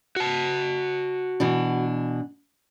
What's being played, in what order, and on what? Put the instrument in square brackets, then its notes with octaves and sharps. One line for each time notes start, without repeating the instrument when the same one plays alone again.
[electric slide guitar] F#4 A5
[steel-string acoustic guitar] B2 E3 D4